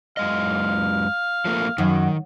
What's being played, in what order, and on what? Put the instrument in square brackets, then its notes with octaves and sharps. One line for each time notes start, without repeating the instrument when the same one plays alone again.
[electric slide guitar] F#2 G#3 D#5 [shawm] F5
[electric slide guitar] F3 A3 A#3
[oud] F#2 [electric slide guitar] D#3